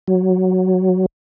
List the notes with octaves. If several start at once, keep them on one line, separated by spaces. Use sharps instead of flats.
F#3